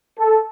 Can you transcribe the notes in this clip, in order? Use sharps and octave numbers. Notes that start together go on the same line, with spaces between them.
A4